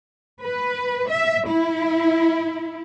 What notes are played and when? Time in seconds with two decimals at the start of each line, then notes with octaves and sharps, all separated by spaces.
0.43 B4
1.10 E5
1.50 E4